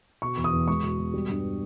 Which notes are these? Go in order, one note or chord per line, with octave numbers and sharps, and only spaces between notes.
B2 C#6
E2
D#6
E2
G#3 C#6
B2
B2
G3
G2